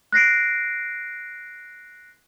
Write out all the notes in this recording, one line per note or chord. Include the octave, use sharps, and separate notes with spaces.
F#6 A#6 C7 D7